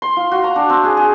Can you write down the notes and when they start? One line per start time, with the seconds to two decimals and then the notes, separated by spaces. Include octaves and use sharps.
0.02 C6
0.17 F4
0.31 F#4
0.44 A#5
0.56 D4
0.70 C4
0.84 G#4
0.97 G#4